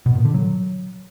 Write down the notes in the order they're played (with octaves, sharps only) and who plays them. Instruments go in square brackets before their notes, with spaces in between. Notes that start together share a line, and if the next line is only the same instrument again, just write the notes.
[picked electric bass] B2
A#2
D3
F#3